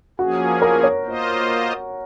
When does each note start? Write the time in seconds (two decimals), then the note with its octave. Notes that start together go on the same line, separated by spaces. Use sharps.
0.19 F3 A#3 C#4 F#4 G#4
0.62 A#4
0.83 C#5
1.05 A#3 F4 C5 D#5